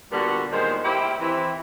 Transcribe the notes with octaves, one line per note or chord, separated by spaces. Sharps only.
A#2 D3 G3 B3 F#4 A4
A#2 D#3 G#3 B3 C5
E4 G4 C5 E5 F5 B5
E3 C4 E4